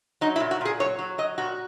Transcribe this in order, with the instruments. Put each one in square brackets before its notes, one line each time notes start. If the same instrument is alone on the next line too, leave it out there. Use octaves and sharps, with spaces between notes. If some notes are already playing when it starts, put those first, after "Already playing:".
[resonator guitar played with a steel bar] F#3 D#4
E4
A#2
F#4
A#2 G#4
F#3 C#5
F#3
F#3 D#5
A#2 F#4